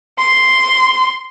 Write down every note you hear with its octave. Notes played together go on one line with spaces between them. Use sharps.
C6